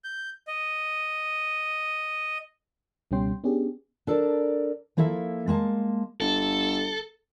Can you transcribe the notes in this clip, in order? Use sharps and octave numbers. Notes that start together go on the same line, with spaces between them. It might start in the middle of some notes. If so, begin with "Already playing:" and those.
G6
D#5
C#2 B2 G3 C#4 G5 C6
B3 C#4 D4 G4 G#4
D4 A4 A#4 D5
F3 A#3 E4 A4 E5
G#3 A#3 A5
G1 A4